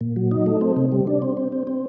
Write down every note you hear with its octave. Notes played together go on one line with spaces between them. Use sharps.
A#2
F#3
D#4
A3
C4
C3
G3
D4
C4
C4
C4
C4